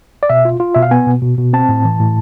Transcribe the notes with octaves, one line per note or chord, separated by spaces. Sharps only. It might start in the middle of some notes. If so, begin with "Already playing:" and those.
D5
B2 E5
F4
F4
B2 E5
F5
B3 G#5
B2
B2
B2
C4 A5
A2
E3
A2